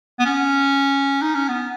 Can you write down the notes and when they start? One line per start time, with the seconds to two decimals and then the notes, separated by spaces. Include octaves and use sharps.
0.19 B3
0.26 C#4
1.22 D#4
1.35 C#4
1.49 B3